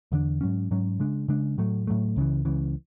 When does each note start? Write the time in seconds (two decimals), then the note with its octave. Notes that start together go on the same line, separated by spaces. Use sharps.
0.12 E2 D3 A3 D4
0.41 G#2 F#3 C#4
0.71 G#2 F#3 C#4
1.00 C#3 G#3 D4
1.28 C#3 G#3 D4
1.58 A2 F#3 A3
1.87 A2 F#3 A3
2.16 C#2 C#3 E3
2.45 C#2 C#3 E3